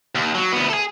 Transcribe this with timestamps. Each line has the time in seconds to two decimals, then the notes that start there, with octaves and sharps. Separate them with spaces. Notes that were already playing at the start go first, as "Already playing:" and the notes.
0.15 D#2
0.35 F#3
0.52 D2 B3
0.69 G#4 A4